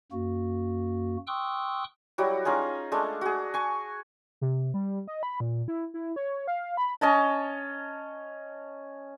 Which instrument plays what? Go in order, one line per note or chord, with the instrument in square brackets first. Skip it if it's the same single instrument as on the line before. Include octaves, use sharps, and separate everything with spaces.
[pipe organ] F#2 A#3 F#4
G5 C6 C#6 D#6 E6 F#6
[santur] F#3 G3 E4 F#4
C#4 D#4 F4 G#4
G#3 A3 D4
F#4 G#4
G#5 C#6
[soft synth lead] C3
G3
D#5
B5
A#2
E4
E4
C#5
F5
B5
[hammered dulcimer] C#4 D#5 A5 A#5